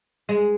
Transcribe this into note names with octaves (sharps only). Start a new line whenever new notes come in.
G#3